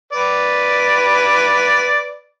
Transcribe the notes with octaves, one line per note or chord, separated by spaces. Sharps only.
B4 D5